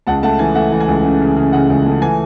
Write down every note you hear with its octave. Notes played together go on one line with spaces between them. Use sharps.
C#2 F#5 A5
A3 F#5 A5
E3 G#5
A3 F#5
E3
G#5
C#2
C#3
C#3
C#3
C#3 F#5
C#2
A3
E3 G#5